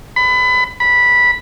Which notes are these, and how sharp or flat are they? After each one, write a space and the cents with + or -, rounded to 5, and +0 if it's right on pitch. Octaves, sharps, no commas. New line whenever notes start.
B5 +25
B5 -10